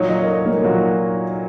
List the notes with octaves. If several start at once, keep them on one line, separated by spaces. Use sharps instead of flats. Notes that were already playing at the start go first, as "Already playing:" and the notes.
Already playing: A#2 F#3 D#4 F#4 C#5
D#5
A#4
C#5
A#3
A#2 F#3 D#4 F#4